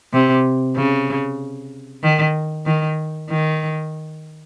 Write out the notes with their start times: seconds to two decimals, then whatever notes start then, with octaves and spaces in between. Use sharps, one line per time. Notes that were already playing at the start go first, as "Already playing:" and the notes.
0.13 C3
0.76 C#3
2.03 D#3
2.66 D#3
3.30 D#3